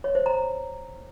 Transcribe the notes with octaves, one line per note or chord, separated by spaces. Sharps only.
C#5
C5
A#5